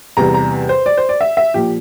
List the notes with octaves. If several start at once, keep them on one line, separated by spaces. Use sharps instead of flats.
E2 C3 G3 A#5
A#5
C5
D5
C5
D5
E5
E5
A#2 F3 G4